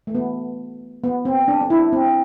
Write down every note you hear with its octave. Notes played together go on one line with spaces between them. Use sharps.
A3
B3
B3
C4
D4
D4
E4
C4